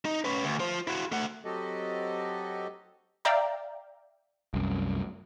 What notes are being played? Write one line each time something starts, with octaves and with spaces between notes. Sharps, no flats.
D#4
C#4 B4
D2
F4 C5
E4 F#4
A3 F#5
F#3 C4 F#4 G4 A4 D#5
D5 E5 F5 G5 A#5
C2 F#2